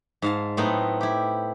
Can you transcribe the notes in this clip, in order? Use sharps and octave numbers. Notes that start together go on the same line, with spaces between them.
G#2 F5 A5
A2 F#3 A3 B3 C4 D#4
E4 G4